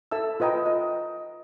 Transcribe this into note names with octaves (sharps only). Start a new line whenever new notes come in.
A4 E5 A5 E6
F4 B4 D#5 G5 A#5
D#5